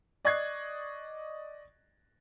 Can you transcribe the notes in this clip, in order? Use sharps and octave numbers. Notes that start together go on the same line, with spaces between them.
D5 D#5 C#6 F#6 G#6 C7